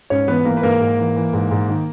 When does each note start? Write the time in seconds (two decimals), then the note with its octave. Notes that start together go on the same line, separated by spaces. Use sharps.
0.10 G#2 C#4 C#5
0.28 E3 B3 B4
0.45 E3 A#3 A#4
0.57 B4
0.63 G#2 A#3 A#4
0.81 G#2
0.99 E3
1.16 E3
1.33 G#2
1.51 G#2
1.69 D#3